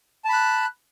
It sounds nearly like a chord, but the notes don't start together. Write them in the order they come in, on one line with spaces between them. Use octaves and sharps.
A5 B5 F#6